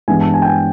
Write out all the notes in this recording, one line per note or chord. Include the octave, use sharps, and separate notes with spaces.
G2 E3 G#3 B3 G#5
A5
G#5
G5
G#5